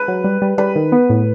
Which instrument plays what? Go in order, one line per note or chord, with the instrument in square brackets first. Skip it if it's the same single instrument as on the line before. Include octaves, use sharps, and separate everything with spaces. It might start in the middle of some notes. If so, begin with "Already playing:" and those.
Already playing: [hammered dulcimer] B4
[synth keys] F#3
G3
G3
[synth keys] G3 [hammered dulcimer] B4
[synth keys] D#3
B3
A2